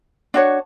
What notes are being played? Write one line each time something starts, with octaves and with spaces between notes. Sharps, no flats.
D4 F#4 C#5